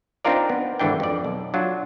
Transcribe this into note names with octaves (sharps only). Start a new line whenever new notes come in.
C4 D4 D#4 F4 A#4 D5
B3
G#1 D3 E3 D4 G5
F2 D5
B1
F#3 D4 F4